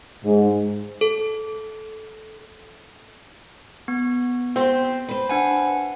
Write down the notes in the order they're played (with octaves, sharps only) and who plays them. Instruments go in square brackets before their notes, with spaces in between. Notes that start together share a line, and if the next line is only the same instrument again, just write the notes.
[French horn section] G#2
[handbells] A4
B3
[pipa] C4 [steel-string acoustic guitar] G4 C5
[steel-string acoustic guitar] B4 C5
[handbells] D4 F#5 G#5